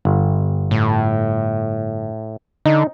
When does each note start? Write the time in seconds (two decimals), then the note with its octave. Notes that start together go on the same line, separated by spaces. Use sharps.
0.05 G1
0.71 A2
2.66 D3 D#4